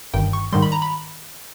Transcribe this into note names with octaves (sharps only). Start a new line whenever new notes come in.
G1 G2 D#3 G5
C#6
G#2 D#3 G3 C6
B5
A#5
B5